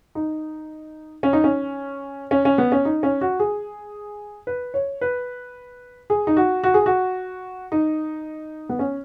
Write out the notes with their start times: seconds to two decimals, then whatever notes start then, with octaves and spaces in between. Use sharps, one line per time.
0.15 D#4
1.23 C#4
1.33 D#4
1.44 C#4
2.31 C#4
2.45 C#4
2.58 B3
2.72 C#4
2.85 D#4
3.03 C#4
3.21 F#4
3.40 G#4
4.47 B4
4.74 C#5
5.01 B4
6.10 G#4
6.27 D#4
6.37 F#4
6.64 F#4
6.74 G#4
6.86 F#4
7.72 D#4
8.69 B3
8.79 C#4